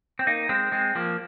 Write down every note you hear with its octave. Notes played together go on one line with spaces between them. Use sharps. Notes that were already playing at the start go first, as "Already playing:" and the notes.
C4
A#3 D#4
G#3 C4
G#3 C4
F3 A#3